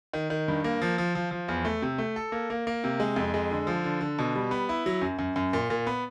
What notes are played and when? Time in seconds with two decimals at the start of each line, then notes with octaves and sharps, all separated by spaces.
0.13 D#3
0.30 D#3
0.48 G2
0.64 A#3
0.82 F3
0.98 F3
1.15 F3
1.31 F3
1.48 E2
1.65 A3
1.82 C3
1.98 A3
2.16 A4
2.32 A#3
2.50 A#3
2.67 A#3
2.84 C3
3.00 G#3
3.16 F2
3.34 G#3
3.51 D3
3.67 F3
3.84 D3
4.01 D3
4.19 B2
4.35 G3
4.51 B3
4.69 E4
4.86 F#3
5.02 F#2
5.19 F#2
5.36 F#2
5.53 A#2
5.70 A#2
5.87 B3